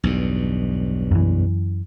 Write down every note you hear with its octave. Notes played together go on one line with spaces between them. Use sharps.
B1 E2 G2
F#2 E3